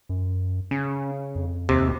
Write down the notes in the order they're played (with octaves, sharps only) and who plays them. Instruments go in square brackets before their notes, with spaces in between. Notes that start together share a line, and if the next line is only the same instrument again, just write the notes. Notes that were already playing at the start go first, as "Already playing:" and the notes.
[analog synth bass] F#2
[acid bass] C#3 [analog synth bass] C#4
[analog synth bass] F2
[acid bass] D#2 [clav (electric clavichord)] C3